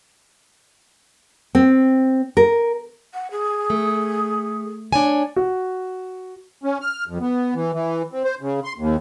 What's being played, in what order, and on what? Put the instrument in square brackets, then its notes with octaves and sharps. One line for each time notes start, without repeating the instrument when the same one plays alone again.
[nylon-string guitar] C4
A#4
[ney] F#5
G#4
[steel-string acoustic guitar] A3
D4 C#5 G#5
[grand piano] F#4
[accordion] C#4
F6
F2
B3
E3
E3
C4
C5
C#3
C6
D#2